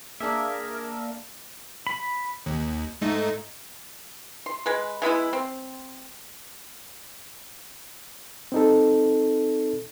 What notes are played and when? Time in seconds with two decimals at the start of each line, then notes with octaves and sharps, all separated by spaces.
0.20 A#3 D4 G#4 A#4 E5
1.87 B5
2.46 D#2
3.01 G#2 A3 D#4
4.46 C6
4.66 G#3 B4
5.02 E3 G#3 B3 E4
5.33 C4
8.52 C4 D#4 A4